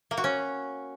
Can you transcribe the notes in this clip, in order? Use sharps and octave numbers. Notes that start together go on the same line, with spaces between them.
A#3
F#4
C#4